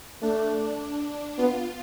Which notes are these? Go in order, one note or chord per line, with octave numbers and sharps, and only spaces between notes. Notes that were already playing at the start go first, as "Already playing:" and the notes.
A3 D4
B3 F4